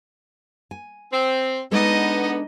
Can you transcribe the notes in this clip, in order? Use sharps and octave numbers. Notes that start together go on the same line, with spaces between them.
G#5
C4
G#3 B3 D4 D#4 A4 D#5